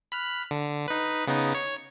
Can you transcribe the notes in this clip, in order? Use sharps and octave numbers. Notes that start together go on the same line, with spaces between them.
B5 F6 F#6
D3
D#4 B4
C#3 B3 D#4
C#5